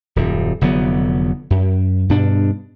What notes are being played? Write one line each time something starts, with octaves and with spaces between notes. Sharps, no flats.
D#1 F#2
F1 D3 F#3 B3
F#2
G2 B2 D4